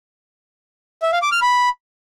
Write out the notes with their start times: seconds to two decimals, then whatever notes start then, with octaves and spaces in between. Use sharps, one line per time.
1.02 E5
1.12 F5
1.22 D6
1.32 F6
1.42 B5